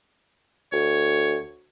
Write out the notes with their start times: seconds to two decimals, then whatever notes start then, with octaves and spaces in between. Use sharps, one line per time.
0.72 D2 C#5